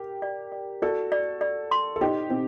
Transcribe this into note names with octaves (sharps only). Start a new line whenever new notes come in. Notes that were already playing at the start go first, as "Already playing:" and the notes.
Already playing: G4 A#4
D5
D5
F#4 A4 D5
D5
D5
C6
A4
D#4 G4 C5
C4 D#4 C5